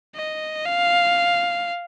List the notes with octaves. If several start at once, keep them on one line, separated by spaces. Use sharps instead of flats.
D#5
F5